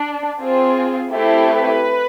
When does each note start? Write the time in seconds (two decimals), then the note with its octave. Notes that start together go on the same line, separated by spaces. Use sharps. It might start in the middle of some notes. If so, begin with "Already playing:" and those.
Already playing: D4
0.40 C4 F4 G#4
1.10 A3 C4 E4 G4
1.45 B4